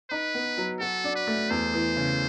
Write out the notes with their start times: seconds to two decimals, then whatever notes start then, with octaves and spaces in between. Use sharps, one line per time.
0.10 D#4 B4
0.35 B3
0.58 F#3
0.80 F#4 A4
1.04 D4
1.16 B4
1.27 A3
1.50 E2 C5
1.74 E3
1.96 C#3